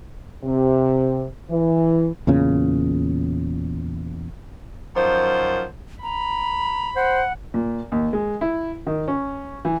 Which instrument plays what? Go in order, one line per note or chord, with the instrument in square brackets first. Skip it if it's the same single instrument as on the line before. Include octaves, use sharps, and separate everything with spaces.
[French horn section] C3
E3
[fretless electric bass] E2 A#2 C#3 C#4
[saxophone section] F#2 D#3 F3 C5
[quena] A#5 [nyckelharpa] B5
[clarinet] C5 [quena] F#5
[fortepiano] A#2
D#2
G#3
E4
D#3
C#4
E3